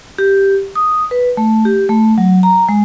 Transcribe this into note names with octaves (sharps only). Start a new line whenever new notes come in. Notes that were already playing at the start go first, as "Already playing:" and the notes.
G4
D#6
B4
A3
G4
A3
F#3
A#5
G#3